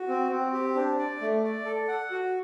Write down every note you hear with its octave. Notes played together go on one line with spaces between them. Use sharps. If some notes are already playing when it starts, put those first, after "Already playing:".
Already playing: F#4
C4
C4
G4
D4
D5
A3
D5
A4
F#5
F#4